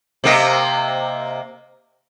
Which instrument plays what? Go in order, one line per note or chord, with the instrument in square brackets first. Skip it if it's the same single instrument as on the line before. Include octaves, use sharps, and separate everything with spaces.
[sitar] C3 A#3 D#5